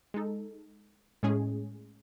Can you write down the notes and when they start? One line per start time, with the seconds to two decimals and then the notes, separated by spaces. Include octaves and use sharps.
0.14 G#3 D#4 A4
1.23 A2 G#3 C#4 G#4